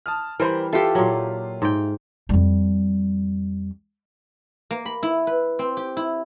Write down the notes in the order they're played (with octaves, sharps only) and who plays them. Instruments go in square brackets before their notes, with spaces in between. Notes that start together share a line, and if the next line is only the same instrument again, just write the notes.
[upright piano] A5 D#6 F6
[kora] E3 [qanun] G3 [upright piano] A#4 C5 B5
[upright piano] E4 F4 C7 [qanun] G4 A4
[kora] A#2 F#3
G#2 G5
[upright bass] F2 G3
[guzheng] A#3
B5
E4
B4
C4
G4
E4